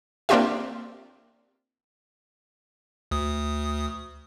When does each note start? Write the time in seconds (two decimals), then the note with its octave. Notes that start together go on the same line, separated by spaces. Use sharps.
0.29 A#3 C4 D4 F4 G4 E5
3.11 D2 D#6